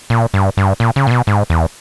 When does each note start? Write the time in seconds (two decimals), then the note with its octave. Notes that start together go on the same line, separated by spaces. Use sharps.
0.10 A#2
0.34 G2
0.57 G2
0.80 A#2
0.96 C#3
1.07 A#2
1.11 B2
1.27 G#2
1.50 E2